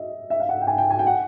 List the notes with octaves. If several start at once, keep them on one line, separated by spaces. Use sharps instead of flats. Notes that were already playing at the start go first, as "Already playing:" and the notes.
Already playing: D#5 E5
E5
F5
F#5
G5
G#5
G5
G#5
G5
F#5